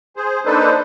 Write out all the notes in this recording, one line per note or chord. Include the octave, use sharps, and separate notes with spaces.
G#4 C5
A#3 D4 D#4 A4 B4 C5